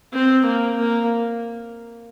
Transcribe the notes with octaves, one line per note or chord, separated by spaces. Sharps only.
C4
A#3
A#3